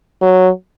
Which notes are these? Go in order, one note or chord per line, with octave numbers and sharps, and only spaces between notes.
F#3